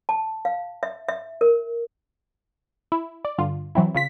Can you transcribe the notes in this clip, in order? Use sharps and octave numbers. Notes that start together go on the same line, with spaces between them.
A5
F5
E5
E5
A#4
E4
D5
G2 D3 F4
E3 F#3 C4 E4
C#3 F4 B6